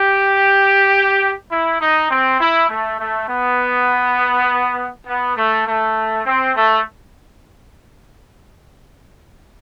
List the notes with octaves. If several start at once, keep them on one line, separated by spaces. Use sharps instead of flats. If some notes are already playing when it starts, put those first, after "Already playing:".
Already playing: G4
E4
D#4
C4
E4
A3
A3
B3
B3
A3
A3
C4
A3